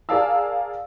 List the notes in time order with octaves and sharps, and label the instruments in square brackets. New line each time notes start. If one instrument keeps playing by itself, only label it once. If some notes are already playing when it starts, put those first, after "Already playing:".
[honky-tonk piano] G#4 A#4 D5 F5 A5 E6